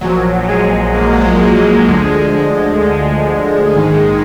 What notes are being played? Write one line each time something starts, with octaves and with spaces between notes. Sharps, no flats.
A#1 A#2 F3 F#3
F#3
G#3
A#3
G#3
F#3
G#3
D2 D3 F3
G#3
A#1 G#2 D#3